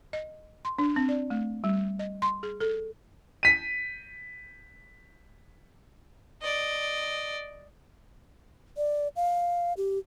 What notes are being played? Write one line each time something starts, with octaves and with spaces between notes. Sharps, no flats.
D#5
C6
D4
C4
D5
A3
G3
D#5
C6
G#4
A4
B6 D#7
D5 D#5
D5
F5
G4